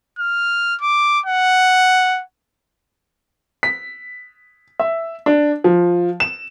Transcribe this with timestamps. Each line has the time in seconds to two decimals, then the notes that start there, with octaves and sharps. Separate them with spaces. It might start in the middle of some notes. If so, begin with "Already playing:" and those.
0.19 F6
0.82 D6
1.26 F#5
3.63 B6
4.80 E5
5.26 D4
5.64 F3
6.20 E7